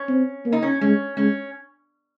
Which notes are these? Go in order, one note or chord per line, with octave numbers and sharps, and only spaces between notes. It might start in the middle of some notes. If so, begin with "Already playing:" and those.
Already playing: C#4
C4
A#3
D#4
C#4
G#3 C#4
G#3 C#4